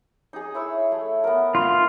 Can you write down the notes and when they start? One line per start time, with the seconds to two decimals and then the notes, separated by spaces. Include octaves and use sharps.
0.33 D#4 G#4
0.54 E4 C#5 E6
0.92 A3
1.24 B3 A#4
1.55 F4